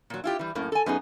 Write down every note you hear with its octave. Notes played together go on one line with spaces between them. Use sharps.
A#2 F#3
E4 F4 G4
E3 G3
F#2 A2 A#3
A4 G#5
F#2 B3 D#4 G#4